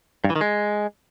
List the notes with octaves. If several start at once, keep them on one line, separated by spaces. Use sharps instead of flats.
G2
E3
D#3
G#3